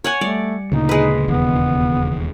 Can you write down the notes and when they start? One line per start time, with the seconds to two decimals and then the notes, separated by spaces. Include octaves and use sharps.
0.04 C#5 F#5 G#5
0.21 G3 A3 D5 C#7
0.72 D2 A#2 C#3 D#4
0.89 G#3 B4
1.28 E1 D#2 B3